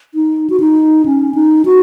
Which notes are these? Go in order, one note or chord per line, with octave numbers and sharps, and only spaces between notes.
D#4
F#4
D#4
C#4
D#4
F#4